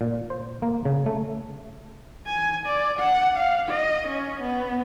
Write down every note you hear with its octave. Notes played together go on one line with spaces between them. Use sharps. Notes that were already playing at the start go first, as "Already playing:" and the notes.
A#2
C5
A#3
C#3
A3
G#5
D5
F#5
F5
D#5
C#4
B3